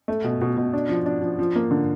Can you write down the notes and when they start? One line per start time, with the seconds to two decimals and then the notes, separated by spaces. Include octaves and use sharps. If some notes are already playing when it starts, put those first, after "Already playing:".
0.08 A3
0.24 B2
0.41 B2
0.57 B2
0.73 D4
0.89 F3
1.06 D4
1.22 F3
1.39 F3
1.56 A#3
1.71 D3